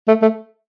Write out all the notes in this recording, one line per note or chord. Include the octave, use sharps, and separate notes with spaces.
A3
A3